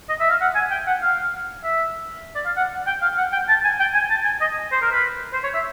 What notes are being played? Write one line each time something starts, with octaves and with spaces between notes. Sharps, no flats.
D#5
E5
F5
F#5
G#5
G5
F#5
F5
E5
D5
F5
F#5
G5
F5
F#5
G5
A5
G#5
G5
G#5
A5
G#5
D#5
C5
A#4
B4
C5
C#5
E5